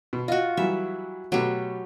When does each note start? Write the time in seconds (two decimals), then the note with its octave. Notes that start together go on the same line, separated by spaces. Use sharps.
0.13 B2
0.28 F4 F#4 D#5
0.57 E3 F#3 G3 E5
1.32 B2 F#3 A3 G4